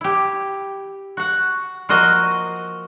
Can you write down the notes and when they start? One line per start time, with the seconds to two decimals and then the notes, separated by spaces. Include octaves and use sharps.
0.01 E4 G4
1.17 F#4 F#5
1.89 F3 A#3 F#4 D#5